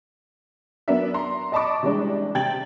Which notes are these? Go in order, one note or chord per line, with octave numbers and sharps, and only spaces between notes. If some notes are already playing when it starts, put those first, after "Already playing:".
F#3 B3 D4 A#4 E5
A#5 C6
D5 D#5 A5 B5 C#6 D6
C3 E3 G3 G#3 D4
C3 G5 G#6 A6 F#7